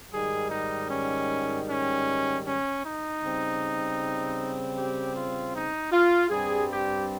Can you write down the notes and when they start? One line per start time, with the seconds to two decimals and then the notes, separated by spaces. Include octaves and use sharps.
0.11 G#2 D#3 G3 G#4
0.50 D#4
0.89 C#4
1.67 C#4
2.45 C#4
2.82 D#4
3.22 C#3 G3 C4
4.76 G4
5.14 F4
5.52 D#4
5.91 F4
6.30 G2 G3 C4 G#4
6.69 G4